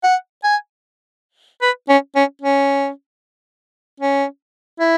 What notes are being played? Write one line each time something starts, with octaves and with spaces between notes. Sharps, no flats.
F#5
G#5
B4
C#4
C#4
C#4
C#4
E4